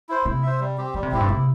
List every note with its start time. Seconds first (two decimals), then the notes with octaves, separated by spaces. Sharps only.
0.09 E4 C5
0.25 C3 E4
0.43 C5 E5
0.60 G3
0.78 C4 G4
0.94 E3 G3
1.03 C3
1.11 A2 C4 E4 G4
1.20 G2
1.29 C3 E4